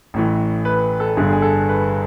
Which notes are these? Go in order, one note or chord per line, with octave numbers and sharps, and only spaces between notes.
A1 A2 E3
B4
A4
G1 G2 D3 G#4
G#4
A4
B4